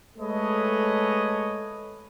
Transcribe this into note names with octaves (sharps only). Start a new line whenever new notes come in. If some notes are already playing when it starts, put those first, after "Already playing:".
G#3 A3 A4 B4 C#5 D#5